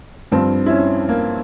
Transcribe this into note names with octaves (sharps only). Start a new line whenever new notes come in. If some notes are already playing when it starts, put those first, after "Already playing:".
G2 F3 C4
E4
C#4
A#3